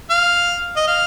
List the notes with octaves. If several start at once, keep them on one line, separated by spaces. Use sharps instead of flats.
F5
D#5
F5